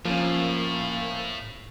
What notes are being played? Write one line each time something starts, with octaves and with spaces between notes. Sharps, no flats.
A2 F3 A#3 C#4